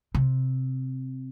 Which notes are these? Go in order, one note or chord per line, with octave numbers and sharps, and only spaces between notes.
C3